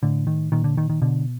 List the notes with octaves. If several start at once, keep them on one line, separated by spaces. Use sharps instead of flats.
A2 D3
D#3
A#2 D#3
D3
D#3
D#3
B2 D3